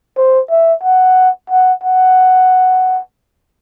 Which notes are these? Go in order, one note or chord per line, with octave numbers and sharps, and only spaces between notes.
C5
E5
F#5
F#5
F#5